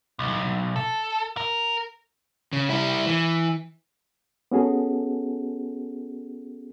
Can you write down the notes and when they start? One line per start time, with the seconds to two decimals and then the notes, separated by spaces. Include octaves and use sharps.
0.19 B1
0.76 A4
1.37 A#4
2.53 C#3
2.70 G3 E4
3.06 E3
4.52 B3 C#4 F#4 G#4 A4